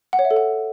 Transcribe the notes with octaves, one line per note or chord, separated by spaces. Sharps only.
F#5
C#5
E5
A4
F#5